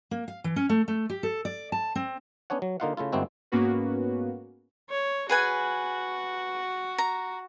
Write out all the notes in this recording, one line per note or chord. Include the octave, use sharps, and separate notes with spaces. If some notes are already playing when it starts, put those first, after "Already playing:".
A#3
F5
E3
C#4
A3
A3
G4
A4
D5
A5
C4
B3 C#4 D4 C#5 F#5
F#3
D3 A#3 D#4 F4 F5 F#5
C#3 A3 E4 F4
G1 G#3 A#3 C4 E4 F#4
G#2 A#3 B3 C#4 F#4 B4
C#5
F#4 G#4 B4 G#5
A#5